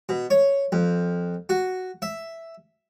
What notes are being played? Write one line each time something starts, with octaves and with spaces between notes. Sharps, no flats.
B2
C#5
F2
F#4
E5